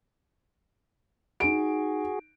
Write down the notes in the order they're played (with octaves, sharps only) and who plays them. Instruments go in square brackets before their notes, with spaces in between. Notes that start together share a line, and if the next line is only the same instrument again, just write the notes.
[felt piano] D#4 D7 [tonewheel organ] F#4 G#4